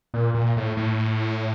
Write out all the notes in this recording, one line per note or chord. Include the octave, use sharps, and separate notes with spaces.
A#2
A#2
A2
A2